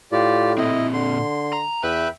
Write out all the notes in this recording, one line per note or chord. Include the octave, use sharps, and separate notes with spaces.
A2 F4 G4 D5
A#2 C4 E4 D#5
D3 C6
A#5
E2 B4 E5 G5 B5